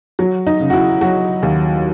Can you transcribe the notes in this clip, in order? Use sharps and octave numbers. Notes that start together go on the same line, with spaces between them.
F#3
D#4
C#3
F#4
E4
F#3 F#4
D#2